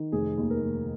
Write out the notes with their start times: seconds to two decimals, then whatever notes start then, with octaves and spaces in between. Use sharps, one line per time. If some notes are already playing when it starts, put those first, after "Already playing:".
Already playing: D#3
0.12 F1 G#4
0.38 D#2
0.50 A#4
0.62 F1